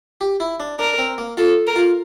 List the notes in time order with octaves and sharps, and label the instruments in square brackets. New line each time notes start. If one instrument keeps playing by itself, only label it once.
[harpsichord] G4
E4
D4
[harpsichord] D4 [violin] A#4
[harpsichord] C4
A#3
[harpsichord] F4 [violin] A4
[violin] A#4
[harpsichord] F4